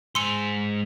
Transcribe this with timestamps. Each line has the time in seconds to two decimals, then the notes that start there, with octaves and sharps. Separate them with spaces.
0.15 G#2 G#5 C6 E6 C#7